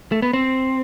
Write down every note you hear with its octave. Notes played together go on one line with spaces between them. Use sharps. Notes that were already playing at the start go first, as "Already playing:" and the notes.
A3
B3
C4